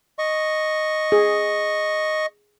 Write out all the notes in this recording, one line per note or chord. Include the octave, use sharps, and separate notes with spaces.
D#5 C#6
G#4